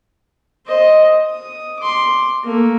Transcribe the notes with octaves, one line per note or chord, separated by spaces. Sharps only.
C5 D#5
D#6
C6 D6
A3 A#3